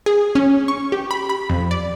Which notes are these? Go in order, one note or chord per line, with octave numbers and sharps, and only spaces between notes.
G#4
C#4
C#6
G4
B5
B5
F2
D5